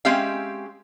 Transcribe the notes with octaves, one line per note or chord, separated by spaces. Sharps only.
G#3 C4 C#4 G4 E5 F5